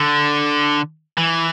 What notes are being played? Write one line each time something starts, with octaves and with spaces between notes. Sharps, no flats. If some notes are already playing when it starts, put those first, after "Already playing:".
Already playing: D3
E3